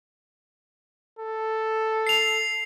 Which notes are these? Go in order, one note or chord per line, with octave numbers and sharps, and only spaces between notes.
A4
C7 F7